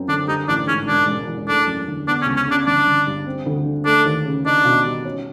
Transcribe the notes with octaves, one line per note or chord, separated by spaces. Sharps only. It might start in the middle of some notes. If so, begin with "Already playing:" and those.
Already playing: F#2 C4
D3 D4
G3 D#4
A1 D4
G#2 C#4
E1 D4
E1
E2
A3 D4
F#2
D3
B3 D4
C#4
C#2
C#4
C#3 D4
G1 D4
G1
G2
C4
D2
D3
A3 D4
D#2
C#3
D4 D#4
B2
G3
C#4